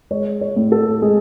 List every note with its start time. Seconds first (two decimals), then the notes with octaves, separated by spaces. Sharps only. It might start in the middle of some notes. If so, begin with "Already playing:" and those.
0.11 G#3 C#5
0.41 C#5
0.56 A2
0.72 A4
1.02 G#3 G#4